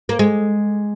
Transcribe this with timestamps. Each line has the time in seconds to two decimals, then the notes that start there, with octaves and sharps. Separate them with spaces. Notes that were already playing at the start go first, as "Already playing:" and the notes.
0.09 A#3
0.19 G#3